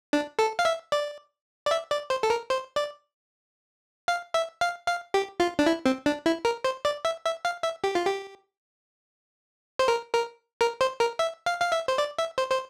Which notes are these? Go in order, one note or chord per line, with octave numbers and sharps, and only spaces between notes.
D4
A4
F5
E5
D5
D5
E5
D5
C5
A4
A#4
C5
D5
F5
E5
F5
F5
G4
F4
D4
E4
C4
D4
E4
A#4
C5
D5
E5
E5
F5
E5
G4
F4
G4
C5
A#4
A#4
A#4
C5
A#4
E5
F5
F5
E5
C5
D5
E5
C5
C5